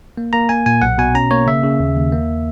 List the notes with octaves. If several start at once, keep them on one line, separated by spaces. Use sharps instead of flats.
A#3
A#3 A#5
A#3 G#5
A#2 G#5
B1 F#5
B2 G#5
C#4 A#5
A#3 C#5
C#3 E5
C#3
D#2
D#2
A#3